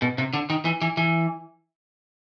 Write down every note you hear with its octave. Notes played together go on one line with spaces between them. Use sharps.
B2
C3
D3
D#3
E3
E3
E3